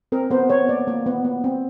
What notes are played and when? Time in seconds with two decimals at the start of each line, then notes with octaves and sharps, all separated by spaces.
0.12 C4 A#4
0.31 B3 C5
0.50 B3 C#5
0.69 A#3 D5
0.88 A#3
1.06 B3
1.25 B3
1.44 C4